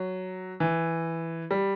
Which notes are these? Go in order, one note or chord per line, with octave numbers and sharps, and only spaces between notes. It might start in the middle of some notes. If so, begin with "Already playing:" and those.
Already playing: F#3
E3
G3